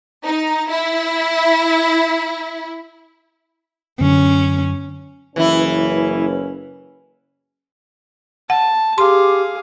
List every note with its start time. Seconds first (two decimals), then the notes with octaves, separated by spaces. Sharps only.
0.24 D#4
0.70 E4
4.00 F#2 D3 C#4
5.36 F#1 E3 C#4 E4 B4
8.50 F#5 A5
8.98 G4 G#4 F5 C6